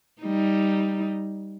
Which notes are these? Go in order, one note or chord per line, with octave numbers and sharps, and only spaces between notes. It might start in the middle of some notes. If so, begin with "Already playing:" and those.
G3 D#4